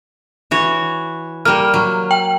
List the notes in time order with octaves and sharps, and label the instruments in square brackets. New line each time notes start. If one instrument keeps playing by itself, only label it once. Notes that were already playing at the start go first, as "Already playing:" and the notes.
[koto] E3 F#4 C#5
[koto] G3 A#3 [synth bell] F6
[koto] F#3
[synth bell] G5